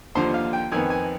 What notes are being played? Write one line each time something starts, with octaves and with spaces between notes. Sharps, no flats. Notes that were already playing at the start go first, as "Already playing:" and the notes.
D#2 D3 F3 C5
F5
G5
F2 D#3 B3 G#5
G#5